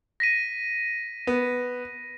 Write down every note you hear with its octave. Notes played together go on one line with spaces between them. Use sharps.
A#6 B6 D#7
B3